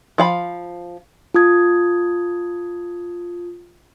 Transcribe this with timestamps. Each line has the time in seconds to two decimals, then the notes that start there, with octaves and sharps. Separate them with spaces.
0.18 F3 F5 B5
1.34 F4 A5 D#6 G#6